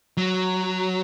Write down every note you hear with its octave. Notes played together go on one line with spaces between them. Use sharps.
F#3